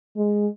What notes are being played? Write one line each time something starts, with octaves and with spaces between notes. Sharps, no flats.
G#3